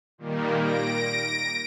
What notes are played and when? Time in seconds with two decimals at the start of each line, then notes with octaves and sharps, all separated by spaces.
0.18 A#2 D#3 G3 A#3
0.60 A#6 D7